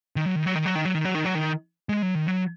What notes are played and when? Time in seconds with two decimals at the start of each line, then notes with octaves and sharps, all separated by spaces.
0.16 D#3
0.26 F#3
0.36 D#3
0.46 F#3
0.55 D#3
0.65 F#3
0.75 D#3
0.85 F#3
0.95 D#3
1.05 F#3
1.15 D#3
1.25 F#3
1.35 D#3
1.89 G#3
2.02 F#3
2.15 D#3
2.28 F#3